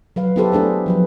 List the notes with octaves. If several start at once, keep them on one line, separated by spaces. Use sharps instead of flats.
F#3 B4 F5
B3 E4 G4 A4 B4 C5
A3 D4 G#4 C5
F3 F#3 B4